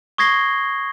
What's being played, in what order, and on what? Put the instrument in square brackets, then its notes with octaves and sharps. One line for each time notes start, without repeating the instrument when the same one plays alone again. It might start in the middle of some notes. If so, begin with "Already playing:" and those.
[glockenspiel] C#6 D#6 G#6 A#6 C7 G7